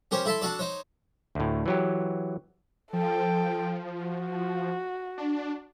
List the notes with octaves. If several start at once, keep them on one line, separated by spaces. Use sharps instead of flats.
C#4 G4 A#4 C5 C#5
E4 A4 E5 A5 C6
D4 F#4 A4 D5
D#4 C5 C#5
D2 A2
E3 F#3 G4
F3 A4 G5
F#4
D4